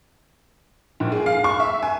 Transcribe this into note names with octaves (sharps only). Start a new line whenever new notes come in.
A#1
G#4
F5
C#6
E5
G#5